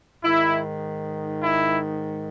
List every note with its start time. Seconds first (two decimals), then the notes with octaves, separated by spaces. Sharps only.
0.23 G#2 D#3 E4
1.43 E4